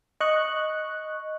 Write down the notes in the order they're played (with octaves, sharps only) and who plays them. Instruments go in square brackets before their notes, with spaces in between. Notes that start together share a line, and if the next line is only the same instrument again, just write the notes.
[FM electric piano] D#5 C#6 F#6